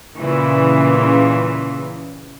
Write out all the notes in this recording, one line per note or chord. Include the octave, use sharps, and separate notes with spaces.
A#2 C#3 E3